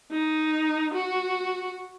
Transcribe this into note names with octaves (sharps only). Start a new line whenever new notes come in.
D#4
F#4